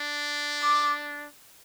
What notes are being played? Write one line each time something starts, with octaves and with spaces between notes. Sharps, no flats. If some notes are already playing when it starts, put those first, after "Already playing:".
Already playing: D4
D6